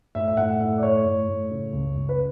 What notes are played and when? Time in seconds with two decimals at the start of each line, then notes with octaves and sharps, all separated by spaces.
0.15 A2 E5
0.28 E5
0.37 A2 F#5
0.60 A2 E5
0.78 D5
0.82 A2 C#5
1.05 A2
1.28 A2
1.50 C#3
1.73 C#2
1.95 C#2
2.09 B4